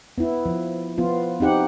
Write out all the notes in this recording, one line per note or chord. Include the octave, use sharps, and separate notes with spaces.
B3 E4
F3
F3 B3 F4
C4 D#4 G4 F#5